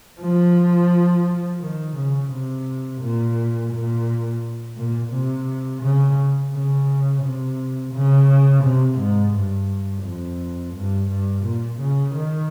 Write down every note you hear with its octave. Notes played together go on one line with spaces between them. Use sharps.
F3
D#3
C#3
C3
A#2
A#2
A#2
C3
C#3
C#3
C3
C#3
C3
G#2
G2
F2
G2
G2
A#2
C#3
D#3